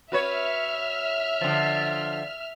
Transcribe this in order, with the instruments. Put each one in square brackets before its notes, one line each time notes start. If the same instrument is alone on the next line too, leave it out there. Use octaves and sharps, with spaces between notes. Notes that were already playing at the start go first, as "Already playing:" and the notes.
[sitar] F#4 B4 C#5 [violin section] E5 F6
[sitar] D3 F3